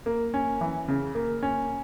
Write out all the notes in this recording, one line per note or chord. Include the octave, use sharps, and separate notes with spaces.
A#3
C#4
E3
C#3
A#3
C#4